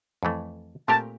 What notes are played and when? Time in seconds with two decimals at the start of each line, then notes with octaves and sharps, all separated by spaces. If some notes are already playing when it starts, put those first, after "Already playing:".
0.23 F2 E3 A3
0.88 A#2 A3 C4 G4 A#4 A5